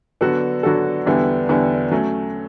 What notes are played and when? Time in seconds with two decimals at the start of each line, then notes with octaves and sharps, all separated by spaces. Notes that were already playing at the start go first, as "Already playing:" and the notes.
0.21 D3 F#3 B3 F#4 A4
0.63 D3 F#3 B3 F#4 A4
1.06 E2 D3 G3 B3 E4
1.49 E2 D3 G3 B3 E4
1.92 F#3 A3 C#4